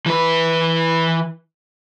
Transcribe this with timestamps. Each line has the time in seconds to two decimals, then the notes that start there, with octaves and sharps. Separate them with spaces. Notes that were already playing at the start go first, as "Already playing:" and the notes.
0.06 E3 B4